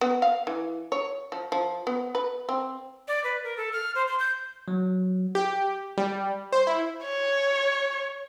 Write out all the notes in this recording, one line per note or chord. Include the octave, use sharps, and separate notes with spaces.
B3
F5
E3
C#5
F3
F3
B3
B4
C4
D5
B4
A#4
A4
F6
C5
C6
G6
F#3
G4
G3
C5
E4
C#5